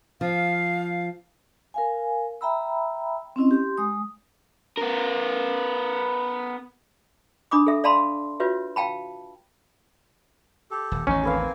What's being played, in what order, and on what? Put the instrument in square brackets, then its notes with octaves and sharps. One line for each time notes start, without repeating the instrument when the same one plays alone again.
[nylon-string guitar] F3 [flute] F5
[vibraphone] A#4 F5 G#5
E5 G5 A#5 B5 E6
C4 C#4 E4 D#5
G4 C6
G#3 D#6
[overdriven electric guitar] B3 A#4
[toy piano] D4 B5 D6 D#6
A4 E5
D5 F5 A5 B5 C6
F4 F#4 B4 C#5 E5
F5 G5 A5 B5
[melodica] G4 A4
[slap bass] D#1
[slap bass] A1 E2 D#3 [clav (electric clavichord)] C#4 [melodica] D#4
[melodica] A#3 C4 G#5 [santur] A4 B4 F5